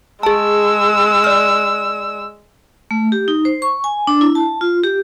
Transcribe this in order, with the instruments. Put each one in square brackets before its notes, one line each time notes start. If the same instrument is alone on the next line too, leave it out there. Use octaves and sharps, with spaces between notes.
[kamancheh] G#3 E6 [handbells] G#4 A5
[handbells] D5 F6
[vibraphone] A3
G4
D#4
C5
C#6
G#5
D4
E4
A5
F4
G4